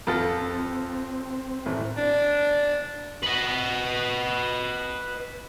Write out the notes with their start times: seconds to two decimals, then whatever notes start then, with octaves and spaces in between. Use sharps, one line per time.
0.07 F2 F4 A4
0.41 C4
1.66 A1
1.97 D4
3.23 B4 D#5